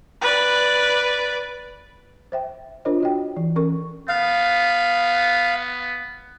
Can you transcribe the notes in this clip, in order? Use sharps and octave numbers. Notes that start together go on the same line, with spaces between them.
B4 D5
C5 E5 G5
D4 F4 A#4 C5 C#5 D#5
F#4 D#5 G5
E3
C#4 A4 A#4 C#6
B3 F5